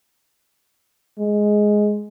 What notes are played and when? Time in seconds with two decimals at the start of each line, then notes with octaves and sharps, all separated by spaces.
1.18 G#3